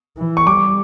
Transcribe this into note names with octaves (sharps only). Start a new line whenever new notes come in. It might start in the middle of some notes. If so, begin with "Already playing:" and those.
E3
C#6
G3 D6